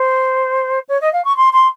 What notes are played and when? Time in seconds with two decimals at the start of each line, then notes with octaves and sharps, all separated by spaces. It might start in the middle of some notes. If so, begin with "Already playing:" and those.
Already playing: C5
0.89 C#5
1.01 D#5
1.13 F5
1.24 C#6
1.37 C6
1.53 C6